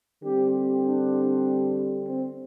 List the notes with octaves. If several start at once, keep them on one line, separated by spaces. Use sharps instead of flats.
D3 G3 C4 G4
D4
C4